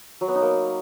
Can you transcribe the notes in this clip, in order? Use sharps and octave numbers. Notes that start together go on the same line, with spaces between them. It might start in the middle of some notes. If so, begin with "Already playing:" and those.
F#3
B3
D#4
A#3